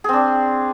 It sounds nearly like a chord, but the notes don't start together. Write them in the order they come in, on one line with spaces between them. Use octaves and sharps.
G#4 C4 D4